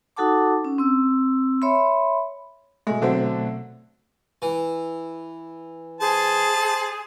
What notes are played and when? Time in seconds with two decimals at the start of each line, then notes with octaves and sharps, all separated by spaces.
0.17 D#4 F#4 A4 F#5 A5 D6
0.65 C#4
0.78 C4 E6
1.62 C#5 E5 B5 C6
2.87 B2 G#3 A3
3.02 D3 F#3 C4
4.42 E3
6.01 G#4 C5 A5